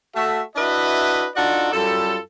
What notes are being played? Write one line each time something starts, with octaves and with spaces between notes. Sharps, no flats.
A3 F#4 A4 E5
D4 E4 F#4 B4 D#5 E5
D4 D#4 F4 F#4 A4 D5
F#2 G3 F4 A4